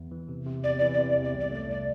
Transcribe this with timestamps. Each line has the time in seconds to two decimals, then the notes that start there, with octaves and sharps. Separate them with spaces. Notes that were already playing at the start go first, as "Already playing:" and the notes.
Already playing: E2
0.11 E3
0.29 C3
0.46 C3
0.64 E2 D5
0.79 E3 D5
0.94 D5
0.98 C3
1.09 D5
1.16 E2
1.24 D5
1.34 C2
1.40 D5
1.51 A3 D5
1.68 C2 D5